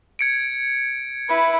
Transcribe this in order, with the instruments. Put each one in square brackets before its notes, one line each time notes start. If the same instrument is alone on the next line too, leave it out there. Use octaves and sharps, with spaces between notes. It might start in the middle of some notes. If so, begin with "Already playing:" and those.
[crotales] G#6 C#7 D7
[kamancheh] E4 B4